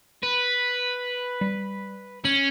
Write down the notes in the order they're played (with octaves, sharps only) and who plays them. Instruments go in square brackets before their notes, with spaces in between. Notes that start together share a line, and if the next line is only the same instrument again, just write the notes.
[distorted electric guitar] B4
[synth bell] G3
[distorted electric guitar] C#4 [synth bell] F#7